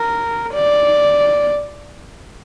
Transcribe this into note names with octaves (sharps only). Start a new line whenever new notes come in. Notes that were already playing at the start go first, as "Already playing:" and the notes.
Already playing: A#4
D5